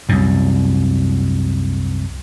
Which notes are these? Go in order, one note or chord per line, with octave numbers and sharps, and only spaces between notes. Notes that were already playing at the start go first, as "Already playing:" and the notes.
C2 F#2